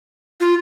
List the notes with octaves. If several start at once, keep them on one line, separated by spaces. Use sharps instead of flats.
F4